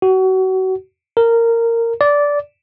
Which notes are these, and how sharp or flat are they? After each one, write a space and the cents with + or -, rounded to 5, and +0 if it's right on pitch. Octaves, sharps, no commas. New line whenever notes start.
F#4 +30
A#4 -15
D5 -15